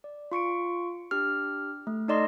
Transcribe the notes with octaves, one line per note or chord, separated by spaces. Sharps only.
D5
F4 C#6 C#7 D7
D4 G4 F6
A3
D#4 A4 D5 D#5 C6